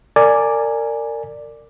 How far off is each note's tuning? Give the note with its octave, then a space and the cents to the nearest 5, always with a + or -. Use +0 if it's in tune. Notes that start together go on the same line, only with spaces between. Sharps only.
A#4 -30 D5 +0 G#5 +0